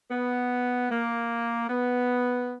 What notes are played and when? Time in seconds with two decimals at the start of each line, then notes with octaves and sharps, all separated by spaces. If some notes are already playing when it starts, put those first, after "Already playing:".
0.09 B3
0.89 A#3
1.69 B3